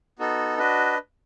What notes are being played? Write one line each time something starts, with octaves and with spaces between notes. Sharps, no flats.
B3 D#4 F#4 A4
D4 F#4 B4 D#5